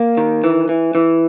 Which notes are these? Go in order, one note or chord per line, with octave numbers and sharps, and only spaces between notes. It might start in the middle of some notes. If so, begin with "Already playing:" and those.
Already playing: A#3
D#3
E3
E3
E3